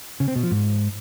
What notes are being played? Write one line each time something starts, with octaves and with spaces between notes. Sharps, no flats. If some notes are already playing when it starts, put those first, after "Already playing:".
C#3
C4
B2
F3
G#2